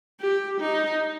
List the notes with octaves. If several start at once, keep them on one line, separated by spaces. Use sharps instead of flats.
G4
D#4